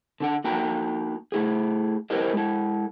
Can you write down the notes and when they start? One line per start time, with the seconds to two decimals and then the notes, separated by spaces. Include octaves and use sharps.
0.20 D3 D4 F#5
0.44 A#3 D#4 F#4 G5 A#5
1.32 A3 E4 G#4
2.10 E4 G4 A#4 C5 D#5
2.33 G#3 E4